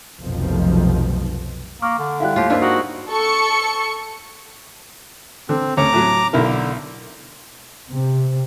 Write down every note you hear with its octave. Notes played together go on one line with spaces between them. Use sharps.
F1 B1 D#3 F3
A#3 C#6 D6 F6
D3
G3 E4 F5 G5 F#6
D#2 A2 F4 G4
G#2 A#3 D4 E4 F4
F#4 A#4 D#6
A4 C#6 C#7
D3 C4
D2 C#4 C#5 A#5 D6
A2 F#3
B1 D3 E4 A#4
C3